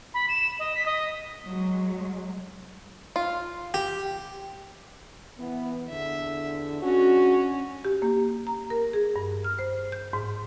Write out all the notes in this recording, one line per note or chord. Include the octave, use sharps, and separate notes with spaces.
B5
E7
D#5
B6
D#5
F#3 G#3
F4
G4
E3 B3
E2 D3 E5
G#3 C#4 D4 F#4
G4
A#3
A#5
A#4
G#4
G2
F6
C5
G6
G#2